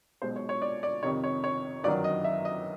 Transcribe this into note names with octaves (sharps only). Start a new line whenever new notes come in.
B1 B2 G#3 C5
C#5
C#5
D5
D5
F2 C3 D#3 C#5
C#5
C#5
G1 F#2 D#3 F#3 D5
D#5
E5
D#5